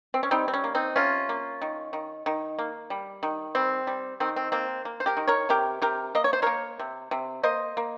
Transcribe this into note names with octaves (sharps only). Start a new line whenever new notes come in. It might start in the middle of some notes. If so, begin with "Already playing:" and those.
C4
C#4
G3 C4 D#4
C4
C#4
A#3
C4 D#4
C3 C#4 F4
A#3
D#3
D#3
D#3
A#3
G3
D#3
G3 C4
G3
D#3 C4
C4
A#3 C4
A#3
C5
G4 A#4
D#3
A#4 C#5
C3 G4 A#4
C3 G4 A#4
A#3 D#5
C#5
C5
A#3 A#4 C#5
C3
C3
A#3 C5 D#5
A#3